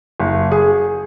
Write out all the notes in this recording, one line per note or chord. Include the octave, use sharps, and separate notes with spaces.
F#1
G#4